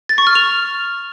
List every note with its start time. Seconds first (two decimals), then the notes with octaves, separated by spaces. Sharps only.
0.09 A6
0.18 C#6
0.27 F6
0.35 F7